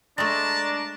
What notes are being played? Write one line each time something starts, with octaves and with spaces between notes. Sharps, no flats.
G#3 A3 D4 A5 A#5